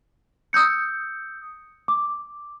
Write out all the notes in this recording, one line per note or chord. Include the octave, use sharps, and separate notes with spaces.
D#6 E6 G6 C#7
D6